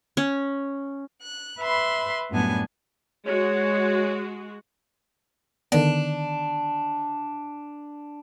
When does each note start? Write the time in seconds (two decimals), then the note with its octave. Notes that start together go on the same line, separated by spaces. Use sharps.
0.17 C#4
1.22 F#6
1.60 B4 E5 B5 C6
2.31 F#2 A2 G3 B3 D4 G#5
3.27 G#3 F#4 C#5
5.72 D3 D#3 B3 D4